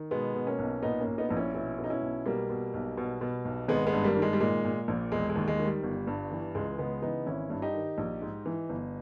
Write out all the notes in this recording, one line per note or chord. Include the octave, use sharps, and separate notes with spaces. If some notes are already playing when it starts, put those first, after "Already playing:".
Already playing: D#3
B2 G#3 B3
B2
A#3 C#4
B1
A#2 B3 D#4
A#3 C#4
A#2
B3 D#4
A#1 D#4
C#4 E4
B2 C#4 E4
B2
D#4
C#4 E4
B1
B2 G3 A#3
B2
B1
B2
B2
B1
G#1 G#3 B3
G#3 B3
G2
G3 A#3
D#3
G#3
G3
A#2 G#3
A#2
A#1
E1 G#3
G#3
D#2
G#3
D#3
G3
G1
G2
E3
C#2 G#3
C#3 G#3 B3
E3 B3 D#4
G#1 C#4 E4
G2
D#4 G4
D#3
A#1
G#2
E3
G1